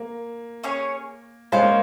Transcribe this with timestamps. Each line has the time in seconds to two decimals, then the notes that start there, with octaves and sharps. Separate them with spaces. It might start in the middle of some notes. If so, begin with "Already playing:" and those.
Already playing: A#3
0.64 C#4 G#4 C#5
1.52 G#3 C#4 F4 C5
1.62 A#3